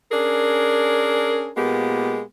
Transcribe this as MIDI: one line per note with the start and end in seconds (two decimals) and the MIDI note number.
0.12 1.50 61
0.12 1.50 62
0.12 1.50 68
0.12 1.50 70
1.57 2.22 46
1.57 2.22 56
1.57 2.22 58
1.57 2.22 59
1.57 2.22 67